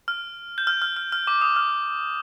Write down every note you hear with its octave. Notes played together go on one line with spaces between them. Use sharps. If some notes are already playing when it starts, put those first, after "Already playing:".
F6
G6
F6
F6
F6
F6
D6
D#6
F6